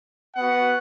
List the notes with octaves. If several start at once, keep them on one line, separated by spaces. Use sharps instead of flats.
B3 F#4 F#5